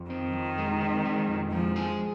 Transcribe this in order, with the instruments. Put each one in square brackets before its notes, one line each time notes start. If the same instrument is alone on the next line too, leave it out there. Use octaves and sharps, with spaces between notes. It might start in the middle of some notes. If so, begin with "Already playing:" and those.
Already playing: [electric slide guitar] F2
[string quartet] D#3 [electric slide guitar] C4
[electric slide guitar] F2
G#3
C4
G#3
F2
[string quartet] F3 [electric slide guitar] G#3
[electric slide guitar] G#4